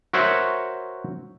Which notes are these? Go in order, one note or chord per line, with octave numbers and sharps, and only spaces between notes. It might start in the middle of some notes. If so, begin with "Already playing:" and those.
F#4 A#4 C5 C#5 E5 F#5